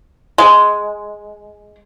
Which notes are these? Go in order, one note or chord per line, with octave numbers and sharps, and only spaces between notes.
G#3